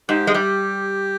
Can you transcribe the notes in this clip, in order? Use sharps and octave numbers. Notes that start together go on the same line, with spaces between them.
G#2 G4
G#3
G3 G4